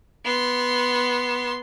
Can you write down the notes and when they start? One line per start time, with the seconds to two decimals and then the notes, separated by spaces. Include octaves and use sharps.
0.25 B3 C6